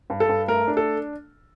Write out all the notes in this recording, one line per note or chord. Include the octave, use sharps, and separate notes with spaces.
G2
A4
G2
A3 A#4
D4
A4